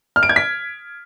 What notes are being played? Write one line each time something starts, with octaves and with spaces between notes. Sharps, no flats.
F6
D7
G#6
B6